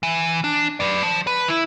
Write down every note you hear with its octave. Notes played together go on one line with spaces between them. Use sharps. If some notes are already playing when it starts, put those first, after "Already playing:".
E3
D4
B4 D5
F3
B4
E4